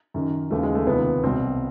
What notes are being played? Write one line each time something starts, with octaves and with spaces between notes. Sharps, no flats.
F#2 D#3
D#2 C#3 E3 A3
G#3
A3
C#2 C3 D#3 B3
C2 B2 C4